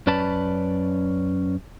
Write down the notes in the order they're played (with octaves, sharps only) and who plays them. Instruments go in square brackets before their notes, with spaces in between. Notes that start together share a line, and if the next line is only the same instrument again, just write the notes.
[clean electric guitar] F#2 C#4 B4 D5 A5 B5